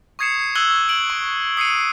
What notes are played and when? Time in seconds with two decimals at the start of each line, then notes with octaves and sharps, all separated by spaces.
0.19 C#6 D#6 G#6 C7 C#7 E7
0.55 C#6 E6 F#6 G#6 F#7 G7
0.89 D7 F#7
1.10 C#6
1.57 D#6 C7 C#7 D#7